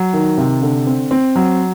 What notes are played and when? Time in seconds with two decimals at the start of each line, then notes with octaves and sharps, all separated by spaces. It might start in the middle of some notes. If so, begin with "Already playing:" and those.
Already playing: F#3
0.13 D#3
0.38 C3
0.62 D3
0.87 C4
1.11 C4
1.36 F#3